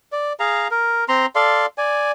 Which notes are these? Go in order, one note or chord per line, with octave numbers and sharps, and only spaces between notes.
D5
G#4 F5 A#5
A#4
C4 A#5 C6
A4 D5 F5 C6
D5 G#5